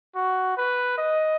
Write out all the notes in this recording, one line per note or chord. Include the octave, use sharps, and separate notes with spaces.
F#4
B4
D#5